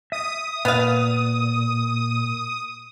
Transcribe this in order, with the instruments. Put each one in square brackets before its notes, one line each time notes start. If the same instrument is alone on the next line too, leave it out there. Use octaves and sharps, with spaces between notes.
[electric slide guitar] E5 [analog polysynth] D#6
[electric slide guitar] A#2 [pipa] B3 F5